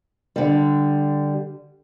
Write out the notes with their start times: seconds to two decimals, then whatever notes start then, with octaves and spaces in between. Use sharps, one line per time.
0.36 D3 G3